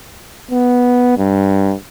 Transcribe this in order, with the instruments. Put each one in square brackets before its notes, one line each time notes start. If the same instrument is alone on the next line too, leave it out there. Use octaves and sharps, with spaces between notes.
[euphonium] B3
G2